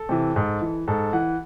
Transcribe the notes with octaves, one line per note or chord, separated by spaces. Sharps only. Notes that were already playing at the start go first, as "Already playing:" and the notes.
Already playing: A4
C3 E3
G#2
E3
G#2 A4
E3 F#5